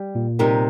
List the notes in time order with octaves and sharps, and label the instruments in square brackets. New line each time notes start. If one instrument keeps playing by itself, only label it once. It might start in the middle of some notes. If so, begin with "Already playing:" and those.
Already playing: [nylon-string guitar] G3
[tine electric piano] A#2
[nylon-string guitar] C3 G3 D#4 A#4